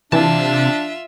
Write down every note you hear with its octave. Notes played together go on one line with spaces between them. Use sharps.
C3 E3 D4 F4 E5 A5